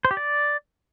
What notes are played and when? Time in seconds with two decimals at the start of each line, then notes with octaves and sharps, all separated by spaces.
0.05 C5
0.11 G4
0.17 D5